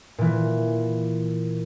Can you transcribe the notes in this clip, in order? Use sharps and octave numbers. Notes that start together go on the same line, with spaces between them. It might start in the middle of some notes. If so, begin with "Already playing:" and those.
A#2 E3